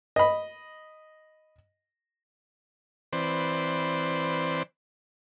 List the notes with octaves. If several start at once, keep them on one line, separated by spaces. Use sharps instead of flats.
D#5 B5
E3 C4 B4 C5 D5